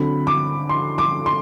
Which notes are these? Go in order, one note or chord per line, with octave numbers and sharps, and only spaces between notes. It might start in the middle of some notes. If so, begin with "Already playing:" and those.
Already playing: D3 F#3 C4 B5
D6
C6
D6
C6